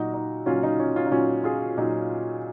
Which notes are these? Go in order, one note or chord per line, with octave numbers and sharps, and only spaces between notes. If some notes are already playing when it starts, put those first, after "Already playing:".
Already playing: A#2 F#3 D#4 F#4
D#4
A#2 F#3 C#4 F4
D#4
C#4
C#4 F4
D#4
A#2 F#3 C#4 F4
F4 G#4
A#2 F#3 D#4